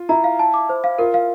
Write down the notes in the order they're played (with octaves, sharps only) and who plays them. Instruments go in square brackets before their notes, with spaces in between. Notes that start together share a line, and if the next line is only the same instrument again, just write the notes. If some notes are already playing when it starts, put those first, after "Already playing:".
Already playing: [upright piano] F4
[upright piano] E4 [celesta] A#5
[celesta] F5
A5
D6
C5
F5
[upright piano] F4 [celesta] A#4
[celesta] F5